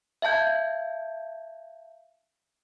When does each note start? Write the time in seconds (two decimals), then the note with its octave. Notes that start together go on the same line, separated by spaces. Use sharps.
0.22 E5 F5 A5 G6 G#6